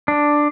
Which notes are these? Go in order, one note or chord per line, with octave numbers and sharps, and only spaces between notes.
D4